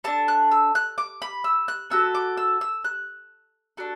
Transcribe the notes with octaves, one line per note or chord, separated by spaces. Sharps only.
D4 A4 A5
F#6
E6
F#6
D6
B5
E6
F#6
B3 F#4 A4 E6
D6
E6
E6
F#6
D4 F#4 A4